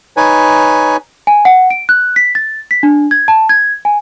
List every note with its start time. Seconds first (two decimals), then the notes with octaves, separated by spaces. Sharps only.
0.17 D#4 B4 C#5 G#5
1.27 G#5
1.45 F#5
1.70 D7
1.89 F#6
2.16 B6
2.35 A6
2.71 B6
2.83 D4
3.11 G#6
3.28 A5
3.49 G#6
3.85 G#5